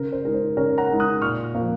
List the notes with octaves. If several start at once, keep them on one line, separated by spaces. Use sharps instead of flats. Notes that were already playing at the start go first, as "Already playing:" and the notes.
Already playing: C#3 A#4
C5
G#3 D#4 A#4
C5
C#3 A#4 C#5
F#5 A#5
G#3 D#4
D#6 F#6
A#2 C#6 F6
F3 A#3